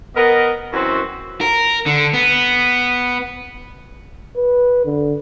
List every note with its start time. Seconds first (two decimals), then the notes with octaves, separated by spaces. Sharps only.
0.16 B3 A#4 D#5
0.73 F#2 E3 C4 E4 F#4
1.41 A#4
1.86 D3
2.14 B3
4.37 B4
4.86 D3